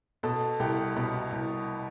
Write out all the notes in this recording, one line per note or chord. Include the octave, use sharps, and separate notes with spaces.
B2 A4
C2 G4
B2
C2